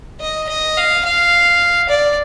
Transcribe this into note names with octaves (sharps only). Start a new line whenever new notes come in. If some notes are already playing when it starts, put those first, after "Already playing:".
D#5
D#5
F5
F5
D5